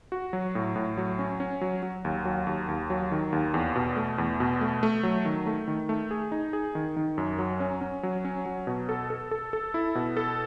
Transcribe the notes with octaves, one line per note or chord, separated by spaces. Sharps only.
F#4
F#3
A2
A2
F#3
C#4
C#4
F#3
F#3
D#2
F#3
D#2
D#2
F#3
D#3
D#2
E2
B2
A3
E2
B2
A3
A3
F#3
D#3
A3
D#3
A3
G#4
D#4
G#4
D#3
D#3
F#2
F#3
C#4
C#4
F#3
C#4
F#3
B2
A4
A4
A4
A4
E4
B2
A4